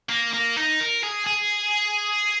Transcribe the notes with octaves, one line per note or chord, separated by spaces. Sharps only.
A#3
A#3
D#4
A#4
G#4
G#4